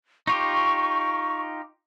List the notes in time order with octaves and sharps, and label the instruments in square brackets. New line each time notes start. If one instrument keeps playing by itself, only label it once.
[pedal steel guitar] D#4 F4 G4 [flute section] C#6